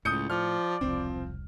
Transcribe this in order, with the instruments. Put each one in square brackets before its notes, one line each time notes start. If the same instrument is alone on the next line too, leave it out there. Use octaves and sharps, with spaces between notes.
[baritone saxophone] C#2 [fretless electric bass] A2 [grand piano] D#6 G6 C#7
[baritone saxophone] F3 [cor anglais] D5 [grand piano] F6
[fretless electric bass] E1 C2 [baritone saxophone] F3 [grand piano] C4